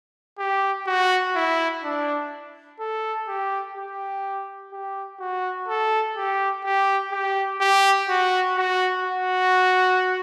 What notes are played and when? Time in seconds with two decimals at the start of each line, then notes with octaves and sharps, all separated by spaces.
0.39 G4
0.87 F#4
1.35 E4
1.83 D4
2.80 A4
3.28 G4
3.75 G4
4.72 G4
5.20 F#4
5.69 A4
6.16 G4
6.64 G4
7.12 G4
7.61 G4
8.09 F#4
8.57 F#4
9.05 F#4